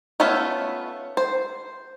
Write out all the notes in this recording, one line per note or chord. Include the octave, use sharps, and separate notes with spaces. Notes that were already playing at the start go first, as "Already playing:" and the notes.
A3 B3 C#4 F4 E5
C5